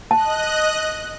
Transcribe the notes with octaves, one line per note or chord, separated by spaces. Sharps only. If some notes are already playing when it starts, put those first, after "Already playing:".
D#5 A5 F#6